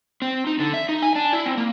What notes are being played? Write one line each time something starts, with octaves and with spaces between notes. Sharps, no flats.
C4
D#4
D3
E5
D#4
G#5
D4
E4
C4
A#3